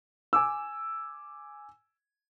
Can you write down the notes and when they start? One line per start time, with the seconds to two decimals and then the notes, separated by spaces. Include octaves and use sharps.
0.33 G#5 D6 E6